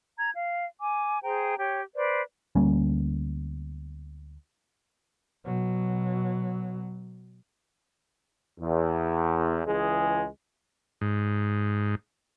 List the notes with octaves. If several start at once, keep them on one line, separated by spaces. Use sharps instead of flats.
A#5 G#6
F5
G#5 D6
G#4 C5 G5 A#5
G4 C#5 G5
B4 C5 D5
D2 G3 A#3 C#4
B2 F#3
E2
C#2 E3 G#3 G#4
G#2